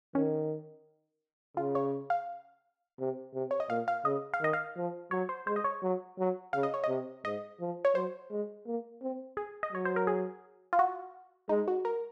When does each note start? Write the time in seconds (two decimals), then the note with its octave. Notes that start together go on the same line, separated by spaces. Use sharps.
0.15 D#3 C#4
1.57 C#3 F4
1.75 C#5
2.10 F5
3.00 C3
3.34 C3
3.51 C#5
3.60 D#5
3.70 A#2 F5
3.88 F5
4.05 C#3 D#5
4.34 F5
4.41 D#3 D#5
4.53 F5
4.77 F3
5.11 F#3 C#5
5.29 C5
5.47 G#3 C5
5.56 D#5
5.64 C#5
5.82 F#3
6.19 F#3
6.53 C#3 F5
6.63 D#5
6.74 C#5
6.84 C3 D#5
7.25 G#2 D#5
7.60 F3
7.85 C#5
7.95 F#3 C5
8.31 G#3
8.66 A#3
9.02 C4
9.37 G#4
9.63 D#5
9.72 F#3 C#5
9.85 C5
9.96 A#4
10.07 G#4
10.73 F4
10.79 F#4
11.49 G#3 D#4
11.68 F#4
11.85 A#4